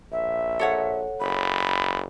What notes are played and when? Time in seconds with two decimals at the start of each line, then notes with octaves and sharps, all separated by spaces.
0.12 A#1 E5
0.59 A4 C#5 F#5
1.20 F#1 B5